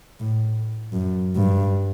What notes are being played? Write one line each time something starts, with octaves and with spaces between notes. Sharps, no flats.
A2
F#2
G2